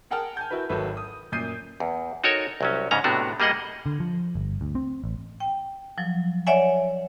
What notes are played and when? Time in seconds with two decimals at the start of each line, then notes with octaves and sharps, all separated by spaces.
0.11 G#4 A#4 F#5 G5 A5 F6
0.37 G#5 A5 G6
0.51 E4 F#4 A#4 B4
0.69 G#1 F#3 F#4 A4 B4 E5
0.97 D#6
1.32 F#2 A#2 D#6 G6 C7 D#7
1.80 E2
2.24 D#4 F#4 A4 A#4 C#5
2.61 C2 F#3 C#4
2.91 G#2 C#3 C#4 A#5
3.04 A2 C3 A3 B3 D4 F#4
3.40 G3 A#3 G#4 D#5 F#5
3.86 D3
4.00 F3
4.35 G1
4.61 D2
4.75 C4
5.04 A1
5.40 G5
5.98 F3 F#3
6.47 C#5 D5 E5 F#5 G#5